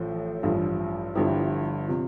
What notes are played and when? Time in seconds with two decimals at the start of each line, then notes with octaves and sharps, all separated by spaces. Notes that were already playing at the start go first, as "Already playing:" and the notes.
Already playing: A1 A2 F3
0.43 A1 G2 F3
1.15 G1 G2 F3 E4 G4
1.88 C3 F3